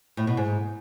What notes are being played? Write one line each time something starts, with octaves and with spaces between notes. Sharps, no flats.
A2
B2
G#2